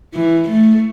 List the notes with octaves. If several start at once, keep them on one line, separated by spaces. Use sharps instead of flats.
E3
A3